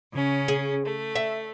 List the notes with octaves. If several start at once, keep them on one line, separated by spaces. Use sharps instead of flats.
C#3 C#4
G#4
A3
E5